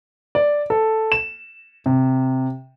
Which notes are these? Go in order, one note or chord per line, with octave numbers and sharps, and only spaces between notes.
D5
A4
E7
C3